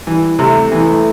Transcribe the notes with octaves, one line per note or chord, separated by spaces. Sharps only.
E3 G3
C3 A3
E3 B3
A3